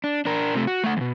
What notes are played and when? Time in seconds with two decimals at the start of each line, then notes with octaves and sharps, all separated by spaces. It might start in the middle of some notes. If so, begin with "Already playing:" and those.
0.04 D4
0.25 D4 A#4
0.55 C3 A3
0.67 F#4
0.84 A3 F#5
0.97 E2 B2